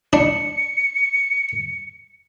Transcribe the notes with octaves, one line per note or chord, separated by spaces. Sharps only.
D4 C#7